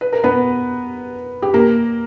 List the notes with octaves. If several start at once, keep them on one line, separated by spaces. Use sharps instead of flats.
B4
A#4
B3 B4
G4
A#3 A#4